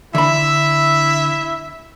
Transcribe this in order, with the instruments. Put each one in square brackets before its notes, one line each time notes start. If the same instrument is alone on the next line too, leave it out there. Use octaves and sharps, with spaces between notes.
[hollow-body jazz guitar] D3 B5 [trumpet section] E4 E5